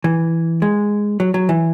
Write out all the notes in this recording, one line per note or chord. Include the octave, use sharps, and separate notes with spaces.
E3
G#3
F#3
F#3
E3